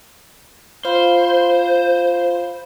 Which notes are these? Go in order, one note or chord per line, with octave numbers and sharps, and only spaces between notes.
F4 C5 F5 B5